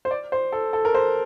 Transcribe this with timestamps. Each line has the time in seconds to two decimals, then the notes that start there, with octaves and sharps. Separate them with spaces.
0.05 C5
0.11 D5
0.32 C5
0.52 A4
0.73 A4
0.85 A#4
0.95 C5